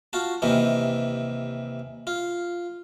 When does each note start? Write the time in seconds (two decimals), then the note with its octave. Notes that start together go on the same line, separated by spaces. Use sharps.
0.13 F4 F#4 A5
0.42 D#2 C3 E3 D#4
2.07 F4